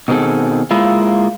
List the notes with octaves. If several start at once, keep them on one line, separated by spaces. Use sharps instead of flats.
B2 D#3 C4 G#4 A4
G#3 A#3 E4 F4